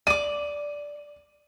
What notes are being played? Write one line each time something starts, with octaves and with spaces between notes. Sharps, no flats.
D5 D6 D#7